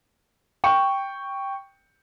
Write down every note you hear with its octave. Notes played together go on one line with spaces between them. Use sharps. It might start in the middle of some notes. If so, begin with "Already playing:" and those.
G5 C#6